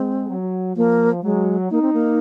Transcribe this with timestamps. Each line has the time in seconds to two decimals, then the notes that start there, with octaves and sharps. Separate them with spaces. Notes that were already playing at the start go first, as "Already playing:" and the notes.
Already playing: G#3 C4
0.29 F#3
0.76 F3 A#3
1.23 F#3 G#3
1.71 A#3 D#4
1.82 C4
1.93 A#3